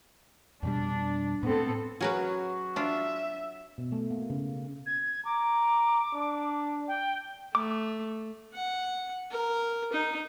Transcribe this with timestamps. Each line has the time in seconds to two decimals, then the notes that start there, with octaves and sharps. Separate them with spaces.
0.63 F2 B2 G3 D4
1.43 A2 B3 C4 A4
2.01 F#3 C#4 F#4 G#4 A#4 B4
2.76 D4 F4 E5
3.78 B2
3.92 A3
4.11 A#3
4.30 C#3
4.86 G#6
5.25 A#5 D6
6.13 D4
6.88 G5
7.55 A3 D6
8.54 F#5
9.31 A#4
9.93 D#4